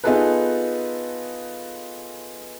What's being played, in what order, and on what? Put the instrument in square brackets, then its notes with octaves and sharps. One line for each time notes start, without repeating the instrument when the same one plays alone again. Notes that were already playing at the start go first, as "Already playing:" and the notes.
[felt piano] B3 D#4 F4 G#4 A4 B4